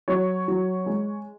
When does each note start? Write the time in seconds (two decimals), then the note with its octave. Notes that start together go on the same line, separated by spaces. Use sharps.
0.08 F#3 C#5
0.48 F#3
0.86 G#3